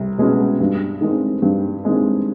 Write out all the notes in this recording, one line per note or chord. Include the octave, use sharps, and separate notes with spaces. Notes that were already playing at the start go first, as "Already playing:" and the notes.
Already playing: C2
B2 G#3 C#4 F#4
G2
D#3 G#3 C4
G2
D#3 G#3 C4